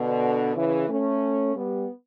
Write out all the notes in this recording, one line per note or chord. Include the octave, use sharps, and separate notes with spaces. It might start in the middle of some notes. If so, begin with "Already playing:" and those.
Already playing: B2 D3
C#3 E3
A3 C#4
G3 B3